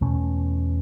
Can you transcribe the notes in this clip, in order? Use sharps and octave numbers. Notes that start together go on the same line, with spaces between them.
E2 B2 A3 C#4